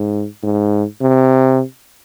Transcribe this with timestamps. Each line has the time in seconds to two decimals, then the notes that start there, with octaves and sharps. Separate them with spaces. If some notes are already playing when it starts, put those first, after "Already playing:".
Already playing: G#2
0.43 G#2
1.01 C3